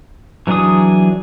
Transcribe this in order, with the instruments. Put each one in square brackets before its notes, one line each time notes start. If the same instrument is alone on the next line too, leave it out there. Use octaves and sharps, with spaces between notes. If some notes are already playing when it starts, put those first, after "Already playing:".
[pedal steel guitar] E3 F#3 D4 G#4 D#6